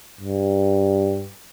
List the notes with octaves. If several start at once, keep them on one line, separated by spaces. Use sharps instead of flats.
G2